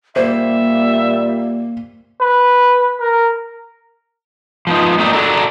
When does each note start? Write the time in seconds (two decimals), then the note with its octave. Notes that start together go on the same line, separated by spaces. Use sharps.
0.16 A#2 G3 A#3 C5 E5
2.21 B4
3.01 A#4
4.67 F3 B3 D#4
4.98 A3 A#3 C4 D4 D#5
5.13 D4 F#4 A4 A#4